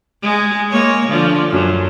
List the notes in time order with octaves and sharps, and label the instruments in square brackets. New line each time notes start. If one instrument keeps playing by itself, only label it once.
[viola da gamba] G#3 G#4
G#3 A#3 C#5
D3 F3 F4
F#2